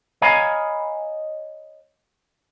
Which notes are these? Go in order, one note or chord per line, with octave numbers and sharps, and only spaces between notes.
C#5 D#5 F5 G#5 A#5 B5